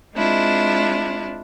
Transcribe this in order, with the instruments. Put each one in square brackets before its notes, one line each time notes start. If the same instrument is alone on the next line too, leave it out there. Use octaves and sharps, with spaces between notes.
[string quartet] G#3 C4 D4 E4 F4